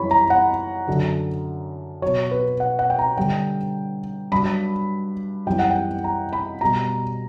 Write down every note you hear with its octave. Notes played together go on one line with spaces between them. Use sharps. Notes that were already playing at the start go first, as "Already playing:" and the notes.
Already playing: F#2 E3 G3 C#5 B5
A#5
F#5
F#2 D3 F#3
B2 F#3 C#5
B4
F#5
F#5
G5
A#5
G2 D3 G3 G5
G2 F#3 B5
F#2 E3 G3 G5
F#5
G5
A#5
B5
B2 G3 A#5